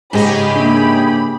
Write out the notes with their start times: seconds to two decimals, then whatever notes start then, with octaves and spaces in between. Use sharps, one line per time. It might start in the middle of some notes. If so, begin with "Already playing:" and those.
0.13 G#2 C#3 G4 G#4 D#5 G#5 B5
0.56 A#3 D4